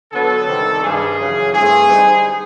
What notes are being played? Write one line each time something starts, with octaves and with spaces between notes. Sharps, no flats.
D3 F#3 B3 A4
C3 D#3 G3 C4
G2 D#3 G3 G#4
F#2 C#3 E3
G2 E3 A3 C4 G#4
D3 G3 C4 D#4